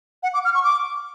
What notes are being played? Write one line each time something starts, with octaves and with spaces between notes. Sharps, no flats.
F#5
D6
F6
C#6
D6